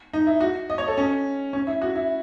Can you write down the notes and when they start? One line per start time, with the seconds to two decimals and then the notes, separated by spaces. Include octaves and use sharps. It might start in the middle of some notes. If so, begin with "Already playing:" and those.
0.13 D#4
0.27 E4
0.41 F#4
0.70 D#5
0.78 C#5
0.88 A4
0.97 C#4
1.53 C#4
1.67 E4
1.82 F#4
1.96 E4